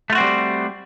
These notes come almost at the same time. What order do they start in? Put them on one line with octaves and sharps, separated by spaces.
A3 F4 F#4 C4 G3